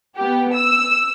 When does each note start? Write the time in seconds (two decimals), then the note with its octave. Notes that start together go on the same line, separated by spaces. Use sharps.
0.17 B3 G4
0.56 E6